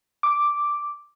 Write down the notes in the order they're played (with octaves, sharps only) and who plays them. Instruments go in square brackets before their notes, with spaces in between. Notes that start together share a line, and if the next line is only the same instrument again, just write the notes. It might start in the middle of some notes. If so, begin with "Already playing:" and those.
[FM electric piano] D6